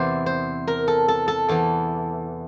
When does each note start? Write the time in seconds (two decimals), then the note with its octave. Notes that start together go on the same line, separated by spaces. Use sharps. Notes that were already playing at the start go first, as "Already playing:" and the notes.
Already playing: E2 C3 E3 C5 D5
0.26 C5
0.67 A#4
0.88 A4
1.08 A4
1.28 A4
1.48 E2 E3 A4